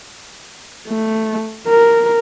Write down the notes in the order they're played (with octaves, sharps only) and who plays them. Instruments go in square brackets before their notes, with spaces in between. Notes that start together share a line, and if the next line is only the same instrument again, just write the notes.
[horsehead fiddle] A3
A#4